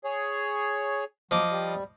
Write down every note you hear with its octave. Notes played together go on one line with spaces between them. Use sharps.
G#4 C#5
F3 F#3 D#5 D6
G3